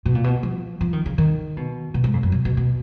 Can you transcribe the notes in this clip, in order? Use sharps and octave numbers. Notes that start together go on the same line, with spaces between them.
B2
A#2
B2
F3
F3
D#3
C#3
D#3
B2
B2
G#2
F2
F#2
B2
B2
B2